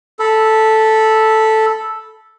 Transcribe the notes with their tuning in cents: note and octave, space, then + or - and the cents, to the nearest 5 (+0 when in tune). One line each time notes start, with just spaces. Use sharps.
A4 +0 B5 -15